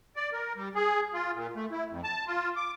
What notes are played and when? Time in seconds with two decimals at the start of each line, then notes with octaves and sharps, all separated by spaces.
0.16 D5
0.33 A#4
0.56 G3
0.75 G#4
1.14 F4
1.34 A#2
1.55 A3
1.71 E4
1.90 F2
2.04 A5
2.27 F4
2.56 D6